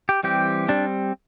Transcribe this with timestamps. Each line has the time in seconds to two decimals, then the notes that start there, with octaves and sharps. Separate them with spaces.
0.09 G4
0.23 E3 G3 C4 G4
0.69 G3 C4 D4